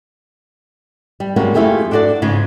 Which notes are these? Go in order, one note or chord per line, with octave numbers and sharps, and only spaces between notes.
G3
G3 G#3 A#3 C#4 F4 F#4
F2 A3 E4 F4 G4 G#4
D4 E4 F#4 A4 D5
G#2 C#3 G#3 C#4 F4